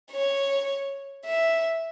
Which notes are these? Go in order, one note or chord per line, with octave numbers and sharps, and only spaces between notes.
C#5
E5